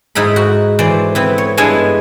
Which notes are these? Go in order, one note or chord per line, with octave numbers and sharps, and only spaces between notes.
G#2 D#4 E4 B5
F#4
E3 C5 D5
B3 C4 E4
C#5
G2 G#3 B3 E4 G#5 A5